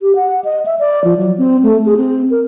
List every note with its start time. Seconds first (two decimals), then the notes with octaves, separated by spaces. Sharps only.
0.01 G4
0.16 F#5
0.44 D#5
0.66 E5
0.79 D5
1.04 F3
1.17 F#3
1.38 C4
1.63 A3
1.86 G#4
1.97 C4
2.30 A#4